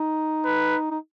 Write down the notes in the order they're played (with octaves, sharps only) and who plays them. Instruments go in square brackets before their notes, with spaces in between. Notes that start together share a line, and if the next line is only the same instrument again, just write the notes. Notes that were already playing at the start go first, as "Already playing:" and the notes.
Already playing: [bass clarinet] D#4
[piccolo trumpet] B4
[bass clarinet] D#4